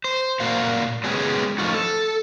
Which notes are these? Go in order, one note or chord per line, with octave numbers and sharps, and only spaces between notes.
C5
A#2 F#4 F5
F#3 G#3 B3 C#4 G4 G#4
F3 A3 C#4 D#4 F4 F#4
A4